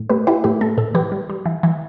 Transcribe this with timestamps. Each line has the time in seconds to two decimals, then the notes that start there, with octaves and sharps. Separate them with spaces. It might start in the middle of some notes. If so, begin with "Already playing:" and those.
Already playing: A2
0.09 A3 G4 B4
0.27 E4 G4 B4
0.44 A2 G4
0.61 A3 A4
0.77 A2 A4
0.94 E3 G4 B4
1.12 G3
1.30 G3
1.46 E3
1.63 E3